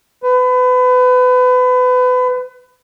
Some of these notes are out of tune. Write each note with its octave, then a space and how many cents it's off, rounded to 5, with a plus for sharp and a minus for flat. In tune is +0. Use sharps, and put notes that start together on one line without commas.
B4 +30